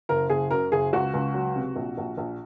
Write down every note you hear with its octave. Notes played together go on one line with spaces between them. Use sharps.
F#1 A#4
F#1 G#4
F#2 A#4
F#1 G#4
C#2 F#4
C#2
F#3
C3
A#1
A#1
A#1